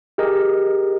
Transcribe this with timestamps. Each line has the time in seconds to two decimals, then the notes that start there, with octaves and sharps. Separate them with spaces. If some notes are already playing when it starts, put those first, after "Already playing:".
0.18 G4 G#4 A#4 D#5